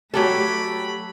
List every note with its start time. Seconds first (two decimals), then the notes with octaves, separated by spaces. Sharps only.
0.14 F#3 A3 G4 A4 B5